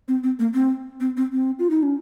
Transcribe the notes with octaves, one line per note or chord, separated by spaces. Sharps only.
C4
C4
A#3
C4
C4
C4
C4
F4
D#4
C#4